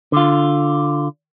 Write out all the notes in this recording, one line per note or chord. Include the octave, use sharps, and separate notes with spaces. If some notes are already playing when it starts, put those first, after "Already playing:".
D3 F4